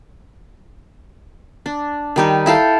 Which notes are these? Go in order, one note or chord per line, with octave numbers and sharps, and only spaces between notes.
D4
D#3 G3 D#4
E4 A4 F5 G5